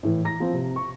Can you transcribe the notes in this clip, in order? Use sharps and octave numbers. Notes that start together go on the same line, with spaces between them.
A2 E3
A#5 A#6
F3 C4
C3
C#6